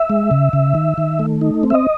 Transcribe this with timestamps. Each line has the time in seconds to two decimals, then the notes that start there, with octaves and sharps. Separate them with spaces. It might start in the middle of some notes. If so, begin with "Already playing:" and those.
Already playing: E5
0.10 G#3
0.31 C#3
0.53 C#3
0.75 D#3
0.98 D#3
1.19 A3
1.41 D#4
1.63 C4
1.70 E5
1.74 D#5